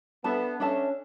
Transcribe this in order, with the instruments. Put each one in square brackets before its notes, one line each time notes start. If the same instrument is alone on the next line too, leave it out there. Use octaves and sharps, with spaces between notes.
[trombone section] B3 [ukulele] D4 A4 E5 A5
[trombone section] C#4 [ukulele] D4 A4 E5 A5